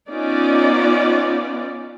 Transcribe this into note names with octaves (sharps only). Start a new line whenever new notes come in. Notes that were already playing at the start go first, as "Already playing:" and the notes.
B3 C#4 D#4 F4 D5